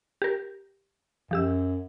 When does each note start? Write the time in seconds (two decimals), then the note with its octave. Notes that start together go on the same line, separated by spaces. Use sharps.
0.22 G4 A#4
1.31 F#2 F3 G4 E6